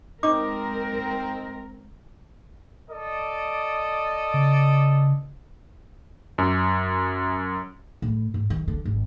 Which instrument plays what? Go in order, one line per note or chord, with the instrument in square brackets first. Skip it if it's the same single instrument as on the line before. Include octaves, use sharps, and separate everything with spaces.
[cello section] G#3 A#4 [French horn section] C4 [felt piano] D#4 [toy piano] D6
[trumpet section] A4 D5 D#5
[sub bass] C#3
[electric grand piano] F#2
[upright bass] A2
G#2
D#3
D3
G#1